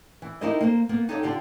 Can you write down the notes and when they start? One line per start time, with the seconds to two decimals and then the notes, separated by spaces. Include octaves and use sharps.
0.22 E3
0.41 D#4 E4 G4 A#4 C5 D#5
0.61 A#3 A#4 C5
0.89 A#3 B3 A#4
1.09 D#4 G4 A4 C#5 E5 F#5
1.23 D3 D4 F4 G4